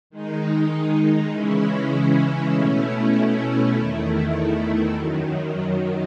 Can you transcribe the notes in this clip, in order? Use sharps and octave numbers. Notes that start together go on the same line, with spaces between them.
D#3 G#3 D#4
C#3 E3 G#3 C#4 E4
B2 A3 C#4 E4
E2 D#3 A3 E4
F#2 D#3 F#3